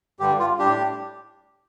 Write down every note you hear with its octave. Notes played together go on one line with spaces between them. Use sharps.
G2 D3 G3 G4
F4
A2 G3 D4 G4